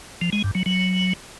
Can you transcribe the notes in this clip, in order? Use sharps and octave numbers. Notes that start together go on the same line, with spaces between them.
F3
G#3
G2
F#3
F#3